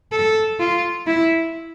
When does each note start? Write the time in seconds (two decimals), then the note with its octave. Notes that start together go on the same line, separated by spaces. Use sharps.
0.12 A4
0.60 F4
1.07 E4